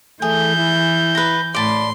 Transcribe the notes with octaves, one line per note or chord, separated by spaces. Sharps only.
E3 A3 G#4 G6
E4
B4 A#5
A2 D5 A5 B5 C6